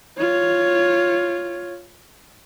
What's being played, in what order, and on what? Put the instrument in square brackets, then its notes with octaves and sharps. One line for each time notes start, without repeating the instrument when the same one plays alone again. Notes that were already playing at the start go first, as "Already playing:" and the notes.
[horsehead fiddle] F4 C#5